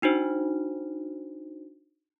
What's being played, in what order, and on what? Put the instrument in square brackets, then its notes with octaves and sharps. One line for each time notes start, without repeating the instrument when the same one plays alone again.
[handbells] D4 D#4 F#4 C5